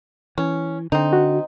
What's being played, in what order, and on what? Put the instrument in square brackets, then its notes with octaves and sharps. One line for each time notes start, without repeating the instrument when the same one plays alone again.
[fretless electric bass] E3 [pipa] C#4
[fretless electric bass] D3 [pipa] C4 D#4
[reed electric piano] F#4